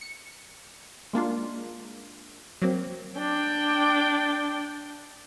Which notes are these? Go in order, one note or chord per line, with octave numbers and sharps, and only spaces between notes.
C#7
G#3 A#3 D4 F4
F#3 A#3 C4
D4 G5